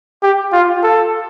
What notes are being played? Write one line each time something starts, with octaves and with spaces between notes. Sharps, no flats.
G4
F4
A4